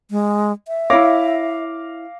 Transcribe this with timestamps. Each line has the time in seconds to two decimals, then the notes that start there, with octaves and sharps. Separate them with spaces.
0.11 G#3
0.68 E5
0.90 E4 C#5 F5 D6 A#6